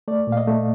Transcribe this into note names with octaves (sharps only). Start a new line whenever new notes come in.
A3 D5
A#2
F5
D#5
A3